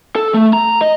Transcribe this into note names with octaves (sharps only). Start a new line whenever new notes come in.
A4
A3
A#5
D#5